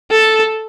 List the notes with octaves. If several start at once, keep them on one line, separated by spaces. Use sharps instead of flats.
A4